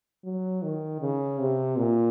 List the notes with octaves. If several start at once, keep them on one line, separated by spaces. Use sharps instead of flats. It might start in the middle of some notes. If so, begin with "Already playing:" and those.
F#3
D#3
C#3
C3
A#2